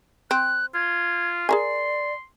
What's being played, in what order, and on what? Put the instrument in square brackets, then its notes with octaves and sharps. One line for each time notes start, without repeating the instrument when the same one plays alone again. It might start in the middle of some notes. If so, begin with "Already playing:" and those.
[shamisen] C4 [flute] F#6
[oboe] F4 [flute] G#6
[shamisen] G#4 A#4 G#5 [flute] D5 [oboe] C6